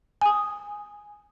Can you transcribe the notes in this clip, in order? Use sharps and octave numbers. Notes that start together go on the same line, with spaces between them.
G#5 D#6